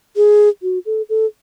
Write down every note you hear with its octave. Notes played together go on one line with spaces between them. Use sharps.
G#4
F#4
A4
A4